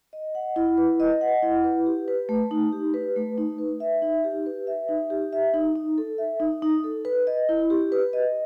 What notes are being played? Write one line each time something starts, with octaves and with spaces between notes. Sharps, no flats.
D#5
F#5
E4
B4
D#5
F#5
E4
B4
G4
B4
A3
D#4
G4
B4
A3
D#4
B4
E5
D#4
G4
B4
E5
D#4
G4
E5
D#4
D#4
A4
E5
D#4
D#4
A4
B4
D#5
E4
G4
B4
D#5